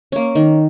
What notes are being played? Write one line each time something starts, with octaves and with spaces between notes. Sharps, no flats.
A#3 C#4
D#3